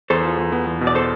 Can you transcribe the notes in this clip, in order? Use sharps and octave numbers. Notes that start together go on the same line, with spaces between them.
E2 A4 C5
F4
E2
B3
E2
B2
D5
A4 C5